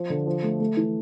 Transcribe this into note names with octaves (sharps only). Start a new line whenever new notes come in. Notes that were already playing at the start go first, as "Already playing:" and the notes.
Already playing: F3
D3
F3
A3
A3
E3